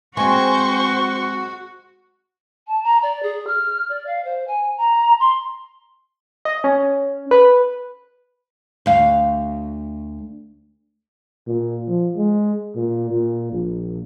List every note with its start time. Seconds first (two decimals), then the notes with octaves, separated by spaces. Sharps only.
0.17 G#3 C4 F#4 C5 C#6
2.68 A5
2.84 A#5
3.03 D5
3.23 G#4
3.47 F6
3.89 D5
4.07 F5
4.25 C5
4.48 G#5
4.77 A#5
5.20 C6
6.45 D#5
6.64 C#4
7.31 B4
8.86 D2 F5
11.47 A#2
11.87 F3
12.16 G#3
12.75 A#2
13.10 A#2
13.52 A#1